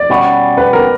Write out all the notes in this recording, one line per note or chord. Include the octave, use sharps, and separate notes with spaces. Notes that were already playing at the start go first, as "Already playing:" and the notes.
Already playing: D5
B2 G3 C#4 F#4
B4
A#4